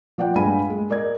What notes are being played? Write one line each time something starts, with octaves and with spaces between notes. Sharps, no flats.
F3 D5 F#5 G5
G2 G#3 F5 G#5 B5 D#7
G#3
A#4 D5 D#5 G#6